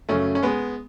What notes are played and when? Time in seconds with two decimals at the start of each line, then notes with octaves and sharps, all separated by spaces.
0.09 F#2 C#3 F#3 A3 C#4
0.35 C#4
0.43 G#3 B3